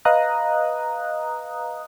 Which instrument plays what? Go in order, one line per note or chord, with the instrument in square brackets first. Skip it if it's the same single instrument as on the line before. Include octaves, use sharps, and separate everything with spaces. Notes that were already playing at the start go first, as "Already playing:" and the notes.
[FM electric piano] B4 D#5 F5 A#5 D#6 F#6